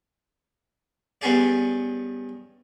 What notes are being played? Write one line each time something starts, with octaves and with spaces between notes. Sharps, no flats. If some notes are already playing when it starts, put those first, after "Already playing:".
G2 B3 C#4 G#4 D5